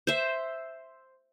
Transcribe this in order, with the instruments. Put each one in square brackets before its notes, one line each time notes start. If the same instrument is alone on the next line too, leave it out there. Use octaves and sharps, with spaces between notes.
[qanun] C5 E5